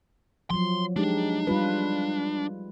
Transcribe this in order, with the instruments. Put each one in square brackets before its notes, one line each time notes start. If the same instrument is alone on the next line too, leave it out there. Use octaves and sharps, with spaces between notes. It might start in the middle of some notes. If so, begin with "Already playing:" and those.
[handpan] F3 F#3 [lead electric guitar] C6
[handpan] G#3 D#4 G4 [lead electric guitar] D4
[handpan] G3 F4 B4